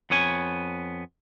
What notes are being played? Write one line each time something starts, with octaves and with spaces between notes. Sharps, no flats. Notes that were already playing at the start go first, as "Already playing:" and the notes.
F2 B3 C#5 G#5